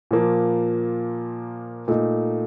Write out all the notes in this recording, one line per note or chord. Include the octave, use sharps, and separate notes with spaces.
A#2 F3 A#3
A#2 A3 D#4